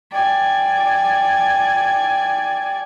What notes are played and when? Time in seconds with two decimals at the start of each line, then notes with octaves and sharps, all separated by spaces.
0.12 D5 G5 G#5